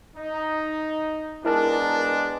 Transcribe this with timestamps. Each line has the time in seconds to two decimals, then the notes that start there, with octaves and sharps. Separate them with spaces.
0.16 D#4
1.45 G#3 B3 D4 E4 A#4 A5